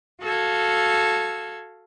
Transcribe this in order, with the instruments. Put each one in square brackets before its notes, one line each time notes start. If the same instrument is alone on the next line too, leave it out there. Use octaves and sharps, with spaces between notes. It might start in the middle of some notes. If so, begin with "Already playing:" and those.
[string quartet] F#4 A4 F5 E6 G#6